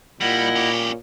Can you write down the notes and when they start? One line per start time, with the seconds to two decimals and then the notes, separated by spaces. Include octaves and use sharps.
0.21 A#2 G3 E4 D#5 F#5
0.56 C#4 G4